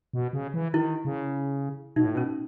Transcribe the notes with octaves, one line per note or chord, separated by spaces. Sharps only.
B2
C#3
E3
D#3 E4
C#3
B2 D#4
A2
B2 C#4